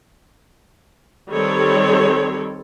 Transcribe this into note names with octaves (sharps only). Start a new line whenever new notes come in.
D#3 G3 C4 A4 C#5